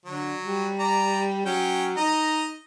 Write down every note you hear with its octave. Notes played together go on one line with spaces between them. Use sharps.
D3 F#3
G3
D5 A#5
F#3 C#4 G5
D#4 D#5 A#5